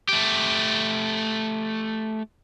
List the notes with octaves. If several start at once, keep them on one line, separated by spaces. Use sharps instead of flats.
A3 G4